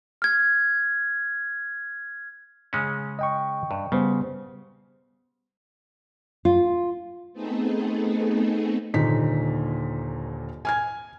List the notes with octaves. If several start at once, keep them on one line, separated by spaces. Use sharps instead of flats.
F6 G#6
C#3 G#3 C#4
D#5 G5 C#6
G2
C#3 G3 B3 C5
F4
A3 B3 C4 D#4 G#4 A4
D#1 D#2 A#2 D3 D#4 B6
G#5 F6 G#6